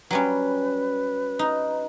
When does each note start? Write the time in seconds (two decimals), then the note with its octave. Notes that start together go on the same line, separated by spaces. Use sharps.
0.11 F#3 G3 C#4 B4
1.39 D#4